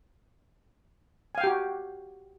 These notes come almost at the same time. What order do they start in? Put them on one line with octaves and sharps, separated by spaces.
G#5 F5 G5 G4 F#4